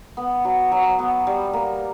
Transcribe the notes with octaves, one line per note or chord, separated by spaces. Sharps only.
B3
F#3
F#3
B3
G3
A#3